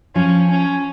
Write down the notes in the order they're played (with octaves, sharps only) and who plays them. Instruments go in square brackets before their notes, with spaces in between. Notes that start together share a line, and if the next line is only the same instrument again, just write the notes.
[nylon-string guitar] F3 [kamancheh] C#4
[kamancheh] C#4